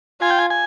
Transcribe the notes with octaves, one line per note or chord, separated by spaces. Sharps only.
F4 G#5
G5
G#5
G#5